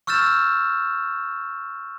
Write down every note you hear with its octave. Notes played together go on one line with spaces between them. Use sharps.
C#6 E6 F6 G6 A6 E7